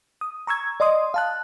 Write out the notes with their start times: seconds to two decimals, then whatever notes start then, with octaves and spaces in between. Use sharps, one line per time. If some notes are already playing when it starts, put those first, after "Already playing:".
0.21 D#6
0.47 A#5 C#6 E6 G#6
0.80 D5 D#5 C6 D#6
1.14 F5 A5 F#6